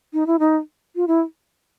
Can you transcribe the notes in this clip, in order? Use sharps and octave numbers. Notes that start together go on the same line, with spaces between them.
D#4
E4
D#4
F4
E4